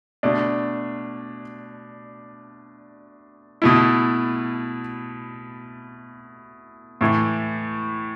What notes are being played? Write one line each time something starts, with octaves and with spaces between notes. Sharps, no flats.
B2 A3 D4
B2 A3 E4
A2 E3 A3